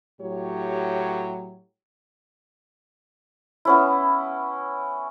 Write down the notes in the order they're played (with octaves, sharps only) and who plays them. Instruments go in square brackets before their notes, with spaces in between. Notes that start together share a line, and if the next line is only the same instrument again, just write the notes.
[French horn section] A2 F#3 G4 C#5
[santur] B3 C#4 E4